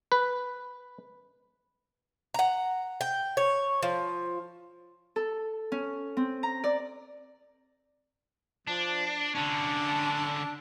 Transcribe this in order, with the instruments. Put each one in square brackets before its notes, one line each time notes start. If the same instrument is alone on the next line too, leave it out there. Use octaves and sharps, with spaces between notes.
[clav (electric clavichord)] B4
[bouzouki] F#5 A#5
G5
C#5
F3
[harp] A4
C#4
C4
A#5
D5
[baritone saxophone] F3 [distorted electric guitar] D4
[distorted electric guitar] D3 C#4 [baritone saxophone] D4